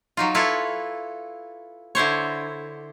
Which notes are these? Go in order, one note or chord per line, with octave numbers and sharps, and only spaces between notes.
F#3 D#4 F4
E4 F4 A4 B4 C#5
D3 E4 C5 C#5